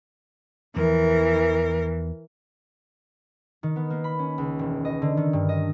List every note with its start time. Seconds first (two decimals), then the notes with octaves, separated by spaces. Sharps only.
0.76 E2 E3 F3 A#4
3.63 D#3
3.76 B3
3.90 A#3
4.04 B5
4.19 C#4
4.38 C#2
4.59 E1
4.85 D#5
5.02 D3
5.17 D#3
5.33 G2
5.49 D#5